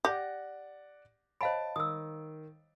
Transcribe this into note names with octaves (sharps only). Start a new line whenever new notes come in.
G4 D5 F#5 A#6
C5 C#5 D#5 F5 A5 B5 D7
D#3 D#6 E6